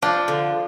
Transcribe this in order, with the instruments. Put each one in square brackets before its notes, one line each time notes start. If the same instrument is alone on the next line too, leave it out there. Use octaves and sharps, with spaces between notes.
[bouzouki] F3 [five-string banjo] D4
[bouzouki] D3